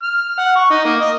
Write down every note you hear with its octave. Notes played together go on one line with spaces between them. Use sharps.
F6
F#5
C#6
D#4
A#3
D#5